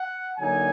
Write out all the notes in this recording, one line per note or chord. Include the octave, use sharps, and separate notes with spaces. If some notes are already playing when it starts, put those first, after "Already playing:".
Already playing: F#5
D3 F#3 A#3 D#4 G#5